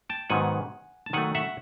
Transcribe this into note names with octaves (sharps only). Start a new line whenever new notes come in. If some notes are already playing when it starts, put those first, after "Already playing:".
G5 A5
G#2 D#3 F#3 B3 F#5 G#5
A5
D#3 F#3 A3 F#5 G#5
E5 F#5